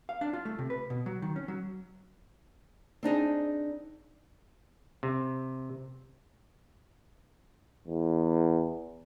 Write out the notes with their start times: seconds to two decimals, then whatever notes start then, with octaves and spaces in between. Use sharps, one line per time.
0.09 F5
0.21 D4
0.33 F4
0.45 A3
0.59 C3
0.70 B4
0.90 B2
1.06 F#3
1.22 D#3
1.36 C#4
1.48 F#3
3.03 C4 D4 D#4 G#4
5.03 C3
7.87 E2